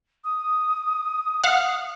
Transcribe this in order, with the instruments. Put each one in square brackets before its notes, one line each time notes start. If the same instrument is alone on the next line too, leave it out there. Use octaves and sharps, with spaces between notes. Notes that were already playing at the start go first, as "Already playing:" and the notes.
[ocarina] D#6
[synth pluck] F5 F#5